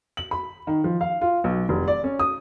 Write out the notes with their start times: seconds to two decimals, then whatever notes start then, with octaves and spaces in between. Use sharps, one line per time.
0.17 F#7
0.31 B5
0.67 D#3
0.84 F3
1.01 F5
1.21 F4
1.44 B1
1.69 F1
1.88 D5
2.04 C#4
2.19 D#6